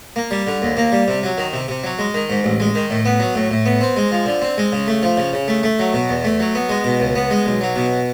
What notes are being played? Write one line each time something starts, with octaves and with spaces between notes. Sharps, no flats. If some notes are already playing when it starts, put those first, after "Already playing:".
A#3
G3
D3
D#2
A#3
G3
C3
F#3
D#3
C3
C3
F#3
G#3
D#3
G#2
A1
G#3
D#3
A2
B3
F#3
A2
A2
B3
C4
G#3
F3
D3
C4
G#3
C#3
A3
F3
C#3
C#3
A3
A3
F#3
B2
E2
A3
F#3
B3
G#3
B2
C#2
B3
G#3
B1
F#3
B2